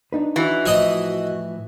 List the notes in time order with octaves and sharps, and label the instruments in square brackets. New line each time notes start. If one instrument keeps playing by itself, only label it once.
[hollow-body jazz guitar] D4 D#4 B4
[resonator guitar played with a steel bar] E3 [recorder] F#4
[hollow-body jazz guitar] A2 F3 [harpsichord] E4 D#5